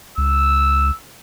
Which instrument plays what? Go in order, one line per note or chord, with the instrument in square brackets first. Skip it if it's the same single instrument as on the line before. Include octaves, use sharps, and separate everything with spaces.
[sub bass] C#2 [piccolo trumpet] E6